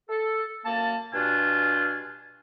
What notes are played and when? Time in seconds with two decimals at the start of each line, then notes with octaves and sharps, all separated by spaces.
0.09 A4
0.65 F#2 A#3 A5
1.13 G2 B2 D4 F4 G#5